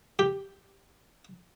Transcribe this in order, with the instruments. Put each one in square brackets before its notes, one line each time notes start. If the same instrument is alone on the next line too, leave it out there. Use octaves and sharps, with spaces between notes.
[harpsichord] G4